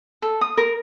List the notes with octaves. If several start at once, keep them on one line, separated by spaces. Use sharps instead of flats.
A4
D#6
A#4